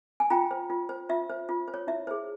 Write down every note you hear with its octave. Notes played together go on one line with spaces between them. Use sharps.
G#5
F4 G5 A#5
C5
F4
C5
F4 E5
C5
F4
C5
C#5
E4 E5
G#4 C5